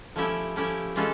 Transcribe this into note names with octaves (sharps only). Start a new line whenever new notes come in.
F3 A3 C#4 E4 G4
F3 A3 C#4 E4 G4
E3 G#3 C#4 F4 A4